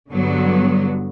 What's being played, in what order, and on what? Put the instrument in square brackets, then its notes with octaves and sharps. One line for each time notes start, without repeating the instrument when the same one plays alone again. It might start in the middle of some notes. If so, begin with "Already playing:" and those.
[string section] G2 D3 F#3 B3